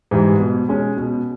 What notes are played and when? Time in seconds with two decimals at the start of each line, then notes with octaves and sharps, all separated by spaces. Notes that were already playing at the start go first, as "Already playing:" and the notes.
0.11 G#2 E3 G3
0.40 B2
0.69 G#3 C#4
0.97 B2